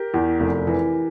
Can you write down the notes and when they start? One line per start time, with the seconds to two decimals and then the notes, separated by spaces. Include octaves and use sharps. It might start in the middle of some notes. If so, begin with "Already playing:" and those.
Already playing: G4 A#4
0.14 E2
0.40 F1
0.67 E3